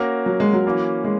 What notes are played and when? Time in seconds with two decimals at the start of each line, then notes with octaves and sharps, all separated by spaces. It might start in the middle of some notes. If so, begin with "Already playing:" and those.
Already playing: A#3 C#4 F#4 A#4
0.26 F#3
0.40 G#3
0.53 F#3
0.66 E3 A#3 C#4
1.04 G#3